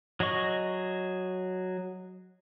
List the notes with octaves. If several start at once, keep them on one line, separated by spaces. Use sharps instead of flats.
F#3 G#4 D#5 C#6